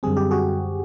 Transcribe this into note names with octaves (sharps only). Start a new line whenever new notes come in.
F#2 D3 G3 C4 G#4
G4
F#4 G#4